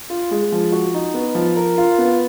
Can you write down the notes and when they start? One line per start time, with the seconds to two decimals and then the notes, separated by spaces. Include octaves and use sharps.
0.10 F4
0.31 G#3
0.52 F3
0.72 F#4
0.94 D#4
1.14 B3
1.35 F3
1.56 A#4
1.77 F4
1.98 B3